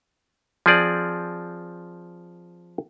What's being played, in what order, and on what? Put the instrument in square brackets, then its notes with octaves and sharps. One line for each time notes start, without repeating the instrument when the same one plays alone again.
[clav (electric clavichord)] F3 C4 G#4 D5